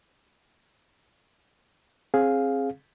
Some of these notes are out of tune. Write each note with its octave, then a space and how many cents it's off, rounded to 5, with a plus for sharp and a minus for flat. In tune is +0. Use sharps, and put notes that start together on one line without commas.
C4 +35 G#4 +0 F5 +10